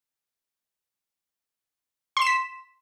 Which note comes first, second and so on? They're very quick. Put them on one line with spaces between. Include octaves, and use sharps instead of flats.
C6 E7 B6